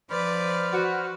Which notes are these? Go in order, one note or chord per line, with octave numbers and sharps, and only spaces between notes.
F3 B4 C5 D5 B5 F6
F#4